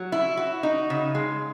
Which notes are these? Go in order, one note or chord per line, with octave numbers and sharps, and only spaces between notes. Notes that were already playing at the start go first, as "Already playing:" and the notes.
Already playing: F#3
E4
F#4
D#4
C#3
G#3